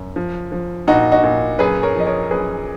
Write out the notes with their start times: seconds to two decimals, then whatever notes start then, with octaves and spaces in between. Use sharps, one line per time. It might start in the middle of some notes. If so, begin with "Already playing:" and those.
Already playing: F#2
0.16 F3
0.52 F3
0.87 A#2 D#4 F#4
1.12 D#4 F#4
1.23 A#2
1.59 F#2 G#4 B4
1.83 A#4 C#5
1.96 F3 D#5
2.07 A#4 C#5
2.31 F#2 G#4 B4